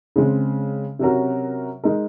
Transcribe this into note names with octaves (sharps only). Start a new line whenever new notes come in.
C#3 G#3 C4
C3 F#3 C#4 F#4 A#4
G#3 D#4 A#4